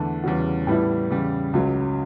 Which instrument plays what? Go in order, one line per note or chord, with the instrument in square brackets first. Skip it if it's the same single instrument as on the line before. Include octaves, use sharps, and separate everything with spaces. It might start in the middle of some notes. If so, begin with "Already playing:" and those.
Already playing: [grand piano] E2 D3 A3
E2 C#3 G3 C#4 F#4
A2 E3 G3 B3 E4
E2 C#3 G3
C#2 C#3 F#3